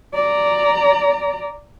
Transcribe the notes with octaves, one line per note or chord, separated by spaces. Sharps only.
D5 A#5